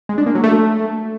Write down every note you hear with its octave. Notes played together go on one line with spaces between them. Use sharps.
G#3
D4
A#3
F#3
A3